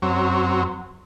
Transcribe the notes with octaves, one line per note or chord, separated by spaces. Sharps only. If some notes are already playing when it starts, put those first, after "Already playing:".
F#2 F#3 C4 C#5